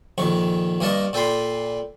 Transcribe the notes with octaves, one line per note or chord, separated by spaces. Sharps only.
A#1 F2 D#3 C#6
G2 A#3 A#4 D#5 A5 C#6
A#2 A4 G5 B5 C6